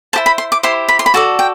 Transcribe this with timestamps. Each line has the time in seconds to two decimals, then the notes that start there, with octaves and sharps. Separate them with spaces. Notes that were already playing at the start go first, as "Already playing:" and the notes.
0.13 E4 G4 C5 A5
0.26 B5
0.38 C6
0.52 D6
0.63 E4 G4 C5 C6
0.89 B5
0.99 C6
1.06 B5
1.14 F#4 A4 D5 A5
1.39 G5